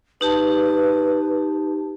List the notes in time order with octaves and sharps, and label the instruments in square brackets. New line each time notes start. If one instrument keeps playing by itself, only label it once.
[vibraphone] D#4 G4 A5 [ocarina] B4